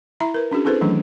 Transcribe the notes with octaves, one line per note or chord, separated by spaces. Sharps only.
E4 E5 A#5 B5
A#4 B4
C#4 D4 F#4 G#4
C4 E4 G#4 A4 B4 C5
D#3 E3 F#3 A3 C#4 D4